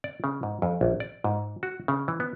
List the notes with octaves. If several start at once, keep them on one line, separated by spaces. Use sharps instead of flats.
D5
C#3
G#2
F2
A#1
D5
G#2
F#4
C#3
E3
B3